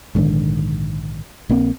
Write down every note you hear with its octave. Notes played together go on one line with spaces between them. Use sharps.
A#1 G#2 D3 D#3
A#1 A#3 C4